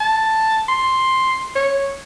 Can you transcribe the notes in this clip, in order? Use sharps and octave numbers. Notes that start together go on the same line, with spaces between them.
A5
C6
C#5